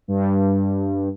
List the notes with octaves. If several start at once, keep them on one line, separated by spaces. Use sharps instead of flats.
G2